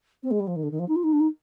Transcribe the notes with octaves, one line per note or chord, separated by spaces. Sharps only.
C4
G#3
G3
F3
D#3
D3
D#3
F3
D#4
F4
D#4
D4
D#4